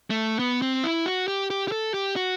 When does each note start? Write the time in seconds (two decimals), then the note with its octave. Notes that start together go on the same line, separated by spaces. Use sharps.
0.10 A3
0.39 B3
0.62 C4
0.84 E4
1.06 F#4
1.28 G4
1.50 G4
1.68 G4
1.72 A4
1.94 G4
2.16 F#4